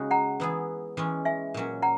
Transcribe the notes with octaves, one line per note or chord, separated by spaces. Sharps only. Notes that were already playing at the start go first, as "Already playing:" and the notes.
Already playing: C#3 G#3 D#4 F#4
F#5 A#5
E3 B3 E4 G#4
E3 G#3 C#4
E5 G#5
A#2 F#3 C#4
F#5 A#5